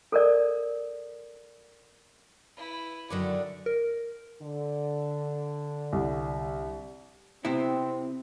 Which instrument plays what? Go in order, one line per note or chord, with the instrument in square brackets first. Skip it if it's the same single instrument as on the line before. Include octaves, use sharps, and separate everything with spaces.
[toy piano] A4 A#4 D5
[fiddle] E4 B4
[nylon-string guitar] F#2 D3 F#3 [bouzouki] D#3 A3 D4
[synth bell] A#4
[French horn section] D3
[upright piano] C2
[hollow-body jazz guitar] C3 B3 E4 [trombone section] C4